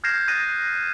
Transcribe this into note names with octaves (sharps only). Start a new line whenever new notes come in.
F6 G6 G#6 A#6 C7 E7
D#6 F#6 A6 A#6 D#7